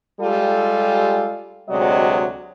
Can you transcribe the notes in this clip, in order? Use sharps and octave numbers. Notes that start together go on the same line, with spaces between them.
G3 G#3 F4 G4 A4
D2 C3 F#3 G#3 D5 D#5